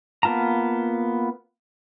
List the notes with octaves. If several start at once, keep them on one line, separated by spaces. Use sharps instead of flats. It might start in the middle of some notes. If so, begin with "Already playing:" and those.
A#3 B3 F4 A5 A#5